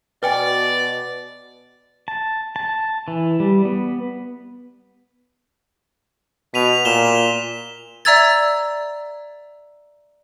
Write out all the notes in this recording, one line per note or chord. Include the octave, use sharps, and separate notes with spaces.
B2 B4 D5 G5 G#5
A5
A5
E3
G3
B3
B2 B6 D#7 F7
A#2 E7 G7
D5 E5 A#5 E6 G#6 A6